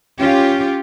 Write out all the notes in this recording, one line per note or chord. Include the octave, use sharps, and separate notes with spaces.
C#4 F4 G4